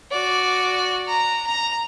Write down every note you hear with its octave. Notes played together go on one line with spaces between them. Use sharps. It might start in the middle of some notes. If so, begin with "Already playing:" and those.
F#4 D5
A#5
A#5